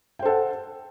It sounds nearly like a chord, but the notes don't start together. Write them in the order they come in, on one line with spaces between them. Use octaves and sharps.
G5 C5 A4 F#5